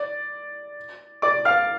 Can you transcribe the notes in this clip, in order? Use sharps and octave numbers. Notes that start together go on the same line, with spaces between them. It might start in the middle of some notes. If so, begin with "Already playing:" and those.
Already playing: D5
D5 D6
F5 F6